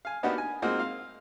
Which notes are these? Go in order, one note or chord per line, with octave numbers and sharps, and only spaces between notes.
F5 G#5
A#3 B3 D4 D#4 F#4 G4
G#5
G#3 A#3 C4 D#4 F4 F#4
F5